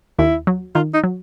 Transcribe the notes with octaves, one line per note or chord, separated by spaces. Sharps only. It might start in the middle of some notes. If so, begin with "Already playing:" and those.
D#2 E4
F#3
D#3 F4
D#4
F#3